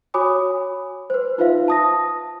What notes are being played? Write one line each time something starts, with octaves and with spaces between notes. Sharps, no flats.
F#4 C#5 G#5 B5 D6 D#6
B4 C5
D#4 F4 B4 C5 E5 F5
A5 D#6 A#6